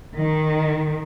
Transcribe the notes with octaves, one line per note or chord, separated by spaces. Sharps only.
D#3